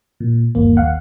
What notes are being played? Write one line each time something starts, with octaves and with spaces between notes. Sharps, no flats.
A#2
G1 D#2 A#3
D#2 F5 F#5